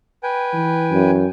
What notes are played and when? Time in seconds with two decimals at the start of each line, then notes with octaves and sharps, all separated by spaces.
0.23 B4 G5 G#5
0.54 E3
0.92 F#2